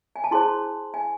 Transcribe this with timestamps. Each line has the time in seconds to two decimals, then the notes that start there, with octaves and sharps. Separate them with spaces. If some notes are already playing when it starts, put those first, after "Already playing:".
0.16 G#5
0.24 A5
0.31 E4 G#4 C5 C6
0.94 G#5